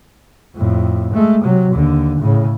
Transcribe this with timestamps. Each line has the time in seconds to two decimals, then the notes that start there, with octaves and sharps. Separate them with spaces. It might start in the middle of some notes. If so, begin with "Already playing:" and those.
0.56 F2 A2
1.14 G#3 A3
1.43 C3 F#3
1.73 D#2 D3
2.21 A2 C#3